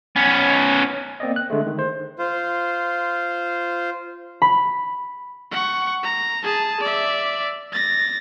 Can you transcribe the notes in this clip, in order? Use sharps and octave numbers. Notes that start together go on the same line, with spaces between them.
B3 C#4
A#3 C4 D5 D#5
F#6
D3 G#3 A3
D#3
C5
F4 C5
B5
F#5 C#6
A#5
G#4 A5
D5 E5
A6 A#6